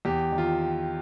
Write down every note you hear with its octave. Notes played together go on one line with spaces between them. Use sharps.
E2 G4
D#3
F4